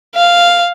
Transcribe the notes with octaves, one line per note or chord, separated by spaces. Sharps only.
F5